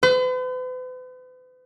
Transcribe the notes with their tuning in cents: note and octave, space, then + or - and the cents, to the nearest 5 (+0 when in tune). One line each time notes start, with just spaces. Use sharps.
B4 +45